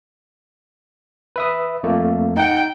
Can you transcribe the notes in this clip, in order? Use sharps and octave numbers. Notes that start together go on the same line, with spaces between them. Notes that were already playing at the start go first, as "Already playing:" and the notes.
B4 E5 D#6
F2 A3 A#3
D#4 F#5 G5